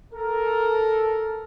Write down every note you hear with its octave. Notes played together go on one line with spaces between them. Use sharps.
A4 A#4